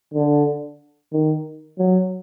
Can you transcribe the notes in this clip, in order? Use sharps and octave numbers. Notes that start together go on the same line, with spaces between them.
D3
D#3
F#3